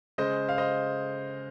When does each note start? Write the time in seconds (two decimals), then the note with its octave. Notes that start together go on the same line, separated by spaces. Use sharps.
0.18 C#3 G#3 C5 D#5
0.49 F5
0.58 C5 D#5